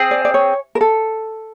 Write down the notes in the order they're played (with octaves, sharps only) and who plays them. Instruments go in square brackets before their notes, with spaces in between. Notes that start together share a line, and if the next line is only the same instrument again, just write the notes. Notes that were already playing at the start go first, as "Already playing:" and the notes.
Already playing: [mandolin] C4 G#4
[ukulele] D5
D5
C#5
A#4
A4